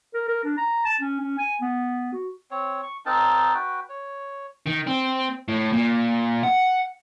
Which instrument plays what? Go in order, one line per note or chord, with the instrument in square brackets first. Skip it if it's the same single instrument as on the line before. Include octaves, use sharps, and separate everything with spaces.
[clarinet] A#4
A#4
D4
A#5
A5
C#4
C#4
G#5
B3
F#4
[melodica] C4 C#5
C#6
C4 D#4 A#4 A5
F#4 B4 G5
C#5
[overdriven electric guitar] D#3
C4
A2
A#2
F#5